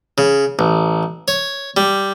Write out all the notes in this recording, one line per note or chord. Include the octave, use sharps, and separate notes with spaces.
C#3
A1
C#5
G3